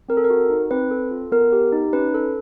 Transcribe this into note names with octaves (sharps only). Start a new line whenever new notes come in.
C4 A#4
A4
A#4
F#4
D#4
C4 B4
A4
F4
B3 A#4
G4
D#4
C#4 B4
A4